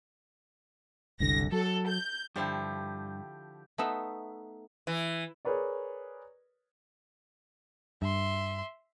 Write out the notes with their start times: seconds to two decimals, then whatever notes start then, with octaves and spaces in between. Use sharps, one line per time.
1.20 F#1 C2 D3 A#6
1.52 F#3 A4
1.88 G6
2.36 G2 D3 F3 E4 G4 G5
3.78 A3 B3 D#4 E5
4.87 E3
5.45 G#4 A#4 B4 C#5 D5
8.02 G2 E5 C6